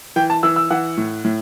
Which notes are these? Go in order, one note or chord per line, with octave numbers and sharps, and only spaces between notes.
E3 G5
A5
E3 E6
E6
E3 F#5
A2
A2